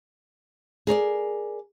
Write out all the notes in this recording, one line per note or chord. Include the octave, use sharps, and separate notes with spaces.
G#4 A#4 C#5 D5